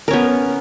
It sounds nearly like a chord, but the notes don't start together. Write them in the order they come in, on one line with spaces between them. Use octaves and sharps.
A#4 C#4 B3